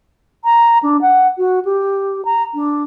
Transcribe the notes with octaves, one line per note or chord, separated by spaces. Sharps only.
A#5
D4
F#5
F#4
G4
A#5
D4